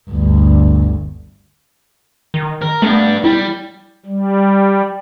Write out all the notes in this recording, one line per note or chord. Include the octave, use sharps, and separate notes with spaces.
G1 D2
D#3
A#4
G3 A3 B3 D4
G3 E4
G3